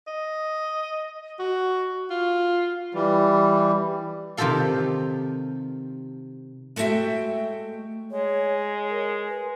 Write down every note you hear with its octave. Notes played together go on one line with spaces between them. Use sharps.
D#5
F#4
F4
E3 G3
C3 D#3 F4 G4 A4 F5
G#3 A3 B3 F#4 E5 G5
G#3 C#5
A#4
B4